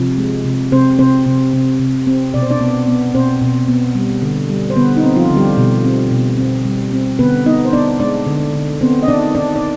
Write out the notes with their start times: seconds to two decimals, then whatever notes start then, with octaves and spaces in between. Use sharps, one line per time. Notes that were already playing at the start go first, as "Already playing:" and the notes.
Already playing: C3 F3
0.18 G#3
0.45 C3
0.72 C3 C4 C5
0.99 C3 C4 C5
1.26 C3
1.53 C3
1.80 C3
2.07 C4
2.34 B2 D5
2.43 C5
2.51 D4 D5
2.61 B3
2.87 B3
3.14 B2 C4 C5
3.42 B2
3.68 B3
3.95 G3
4.22 D3
4.50 G3
4.70 C5
4.76 D3 B3 B4
4.96 D#4
5.03 C4
5.16 F3 F4
5.30 D3
5.37 G3 G4
5.57 B2
5.84 C4
6.11 B2
6.38 C4
6.65 G3
6.92 C4
7.19 D3 B3 B4
7.46 B3 D#4 D#5
7.65 C5
7.73 B3 D4 D5
8.00 G#3 D4 D5
8.27 D3
8.54 D3
8.81 B3 C4 C5
9.02 D#5
9.08 D#3 D4 D5
9.35 D#3 D4 D5
9.56 D5